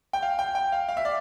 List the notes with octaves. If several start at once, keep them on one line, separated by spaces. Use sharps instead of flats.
G5
F5
G5
G5
F5
F5
E5
D5